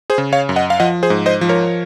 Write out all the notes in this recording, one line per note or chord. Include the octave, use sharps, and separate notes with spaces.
G#4 C5
C#3
C#5 F5
F#2
D#5 F#5
F5
F3 D#5 F#5
G#4 C5
G#2
C5 D#5
F3
A#4 C#5